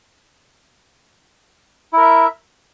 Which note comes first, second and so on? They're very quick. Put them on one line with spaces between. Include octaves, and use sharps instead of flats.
E4 A#4 E5